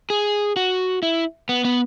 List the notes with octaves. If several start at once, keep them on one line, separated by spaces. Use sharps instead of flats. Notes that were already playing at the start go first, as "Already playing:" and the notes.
G#4
F#4
E4
B3
B3